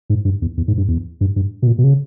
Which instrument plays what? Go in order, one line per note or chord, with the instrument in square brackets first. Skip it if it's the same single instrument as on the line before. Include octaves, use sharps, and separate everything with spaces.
[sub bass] G#2
G2
E2
E2
G#2
G2
E2
G2
G2
B2
A#2
B2
C#3